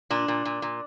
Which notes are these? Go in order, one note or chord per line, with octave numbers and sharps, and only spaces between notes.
A#2 D4
A#2
A#2
A#2